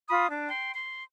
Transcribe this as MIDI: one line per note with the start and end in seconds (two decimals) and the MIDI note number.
0.09 0.27 65
0.09 0.27 83
0.09 0.27 87
0.29 0.47 62
0.48 0.72 79
0.48 0.72 84
0.75 1.02 84